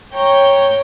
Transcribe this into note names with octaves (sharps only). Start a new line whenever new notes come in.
C#5 G5 A#5 G6